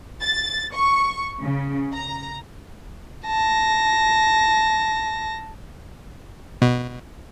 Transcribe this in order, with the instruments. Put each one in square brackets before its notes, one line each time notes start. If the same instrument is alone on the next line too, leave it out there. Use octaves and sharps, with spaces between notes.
[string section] A6
C#6
C#3
A#5
[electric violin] A5 A#6
[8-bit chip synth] B2